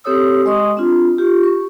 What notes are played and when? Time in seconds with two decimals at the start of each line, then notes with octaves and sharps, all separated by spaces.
0.04 C4 G4 A4 C#5 D#6 E6
0.45 G#3 D#5 C6 C#6 D#6
0.77 C4 D4 F4
1.18 F4 G4
1.43 C#6